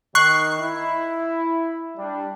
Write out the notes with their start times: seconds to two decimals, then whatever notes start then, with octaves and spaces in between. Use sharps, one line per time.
0.15 D#3 C#6 F#6 C7
0.60 E4
1.96 G3 D4